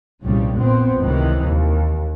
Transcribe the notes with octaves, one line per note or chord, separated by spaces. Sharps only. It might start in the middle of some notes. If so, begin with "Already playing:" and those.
C2 F2 A#2 C#3 G3
A#1 B3 C4
F1 C#2 C3 D#3 E3
D#2